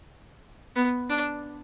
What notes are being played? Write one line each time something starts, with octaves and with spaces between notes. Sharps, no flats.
B3
D4